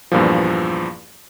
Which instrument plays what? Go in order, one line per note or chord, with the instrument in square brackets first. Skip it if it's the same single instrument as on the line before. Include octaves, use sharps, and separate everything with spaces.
[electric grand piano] E2 G2 A#2 F3